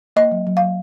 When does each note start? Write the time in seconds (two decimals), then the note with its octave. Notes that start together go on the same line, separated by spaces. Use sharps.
0.16 A#3 D#5
0.31 F#3
0.47 F#3
0.57 F#3 F5